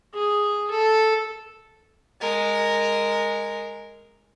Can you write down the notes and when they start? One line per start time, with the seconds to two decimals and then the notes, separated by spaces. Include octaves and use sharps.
0.14 G#4
0.70 A4
2.21 G#3 A#4